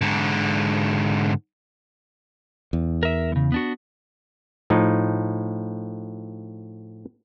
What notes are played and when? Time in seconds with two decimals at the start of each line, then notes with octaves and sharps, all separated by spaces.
0.01 G#2 D3
2.73 E2
3.03 A#4 E5
3.32 C#3 E3
3.52 B3 D4 F#4
4.70 A2 F3 D#4